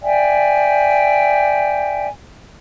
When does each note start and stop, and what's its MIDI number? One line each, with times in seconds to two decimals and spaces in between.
0.02 2.07 74
0.02 2.07 76
0.02 2.07 79
0.02 2.07 80